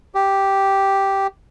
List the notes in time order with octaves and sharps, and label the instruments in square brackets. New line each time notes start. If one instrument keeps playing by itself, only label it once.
[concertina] G4